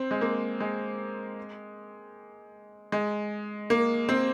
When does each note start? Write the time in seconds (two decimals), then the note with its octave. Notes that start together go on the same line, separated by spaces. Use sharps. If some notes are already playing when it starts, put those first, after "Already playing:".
Already playing: C4
0.11 G#3
0.21 A#3
0.61 G#3
2.92 G#3
3.70 A#3
4.09 C4